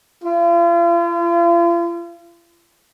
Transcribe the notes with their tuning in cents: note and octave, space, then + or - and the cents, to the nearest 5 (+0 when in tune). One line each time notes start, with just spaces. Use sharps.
F4 -40